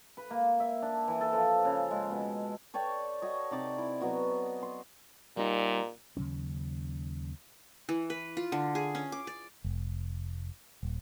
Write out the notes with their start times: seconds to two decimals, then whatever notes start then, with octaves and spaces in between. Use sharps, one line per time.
0.17 B4
0.31 A#3
0.60 E5
0.82 D4
1.08 E3
1.21 A4
1.33 F3
1.65 C#3
1.91 G#3
2.11 B2
2.74 A4 C#5 D5 G5
3.22 F#4 C#5 D#5
3.51 C3 D#4 D5 D6
3.78 E4
4.01 F#3 B3 F#4 D#5
4.63 C6
5.37 A#2 G3 D#4
6.17 D#2 C#3 F#3 C#4
7.89 E3
8.10 B4
8.37 F4
8.52 D3
8.75 G#4
8.95 C#4
9.12 D6
9.27 D5
9.64 F1
10.83 D#1